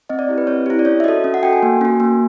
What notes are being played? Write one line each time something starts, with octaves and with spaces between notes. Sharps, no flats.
C4 D#5
D5
E4 G4
B4
C4 C#5
E4 G4
D5
C#4 C#5
E5
F#4 A4 D#5
C#4
F#5
F#4 A4 G5
G#5
A#3
C#4 F#4
A#3